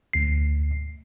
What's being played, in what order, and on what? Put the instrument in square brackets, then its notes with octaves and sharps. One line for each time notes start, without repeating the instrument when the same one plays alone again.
[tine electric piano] D2 C7